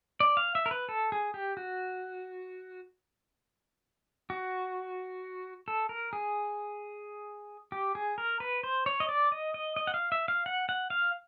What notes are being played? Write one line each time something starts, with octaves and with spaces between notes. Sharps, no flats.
D5
F5
E5
A#4
B4
A4
G#4
G4
F#4
F#4
A4
A#4
G#4
G4
G#4
A#4
B4
C5
C#5
D#5
D5
D#5
D#5
D#5
F#5
F5
E5
F5
F#5
F#5
F5